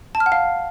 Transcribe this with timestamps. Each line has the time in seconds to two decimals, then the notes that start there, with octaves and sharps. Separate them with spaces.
0.15 A5
0.20 F6
0.26 F#5
0.32 F5